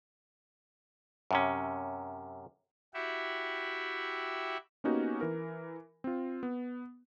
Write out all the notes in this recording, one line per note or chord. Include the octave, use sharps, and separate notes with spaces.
F#2 C3 C#4
E4 F#4 G4 E5
A#3 B3 C#4 D#4 F#4 G4
E3 A#4
C4 F4
B3